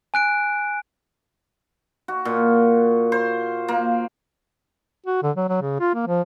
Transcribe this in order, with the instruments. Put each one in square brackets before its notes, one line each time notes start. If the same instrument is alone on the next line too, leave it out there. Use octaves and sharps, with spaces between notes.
[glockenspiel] G#5 F#6 D7
[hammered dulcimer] F#4
A#2
C5
A#3
[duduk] F#4
D3
F#3
F#3
C#3
F4
A#3
F3